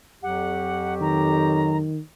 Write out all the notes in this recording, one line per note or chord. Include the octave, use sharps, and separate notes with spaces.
F2 F#3 G4 F#5
D#3 A#5